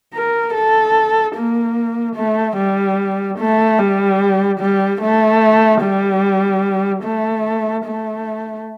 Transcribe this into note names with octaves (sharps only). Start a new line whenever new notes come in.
A#4
A4
A#3
A3
G3
A3
G3
G3
A3
G3
A3
A3